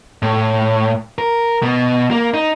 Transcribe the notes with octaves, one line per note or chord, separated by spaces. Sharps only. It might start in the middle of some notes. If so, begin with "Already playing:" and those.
A2
A#4
B2
A#3
D#4